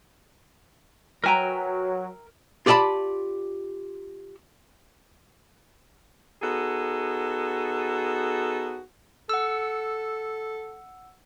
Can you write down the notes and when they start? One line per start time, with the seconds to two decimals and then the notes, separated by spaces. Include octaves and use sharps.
1.24 F#3 A#4 B4 E5 G5 G#5 A#5
2.66 F4 G4 D5 D#5 A5 B5
6.42 B3 D#4 F#4 G#4 A4
9.29 A4 F#5 E6